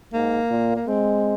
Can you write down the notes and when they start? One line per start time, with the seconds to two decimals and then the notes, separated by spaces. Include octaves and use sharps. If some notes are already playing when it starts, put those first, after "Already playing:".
0.13 G#2 A#3
0.50 A#2
0.76 A#3
0.87 G#3 C4